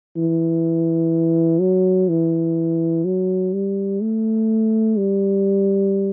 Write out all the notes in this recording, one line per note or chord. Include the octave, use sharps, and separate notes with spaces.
E3
F#3
E3
F#3
G3
A3
G3